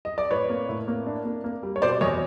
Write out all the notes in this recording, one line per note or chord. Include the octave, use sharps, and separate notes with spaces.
D#5
D5
A2 B4 C#5
A#3
A2
A#3
D4
A#3
A#3
G3
C#5
B2 C5 D5
E2 C#5 D#5